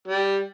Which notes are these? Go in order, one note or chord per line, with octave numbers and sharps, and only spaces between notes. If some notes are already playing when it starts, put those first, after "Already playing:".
G3